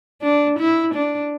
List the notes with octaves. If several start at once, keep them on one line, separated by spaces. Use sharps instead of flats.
D4
E4
D4